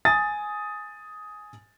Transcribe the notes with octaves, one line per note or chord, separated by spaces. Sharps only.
G#5 D#6 A6